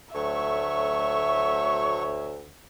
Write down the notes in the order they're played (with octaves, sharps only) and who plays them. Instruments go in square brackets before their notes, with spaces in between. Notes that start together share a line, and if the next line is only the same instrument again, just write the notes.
[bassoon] D2 [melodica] F#3 A3 C#6 [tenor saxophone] C#5 [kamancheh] E5